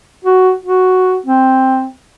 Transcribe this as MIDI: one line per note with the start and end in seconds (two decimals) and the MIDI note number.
0.25 0.52 66
0.65 1.15 66
1.26 1.87 60